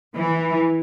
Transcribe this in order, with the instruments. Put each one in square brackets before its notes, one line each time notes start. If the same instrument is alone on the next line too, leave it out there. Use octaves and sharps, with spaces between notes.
[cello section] E3